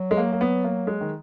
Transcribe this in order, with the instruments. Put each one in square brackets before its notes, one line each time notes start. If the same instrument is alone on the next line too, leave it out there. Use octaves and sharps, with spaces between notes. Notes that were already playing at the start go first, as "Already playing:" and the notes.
Already playing: [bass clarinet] F#3
[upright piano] G#3
A#3
A#3
B3
A#3
G#3
D#3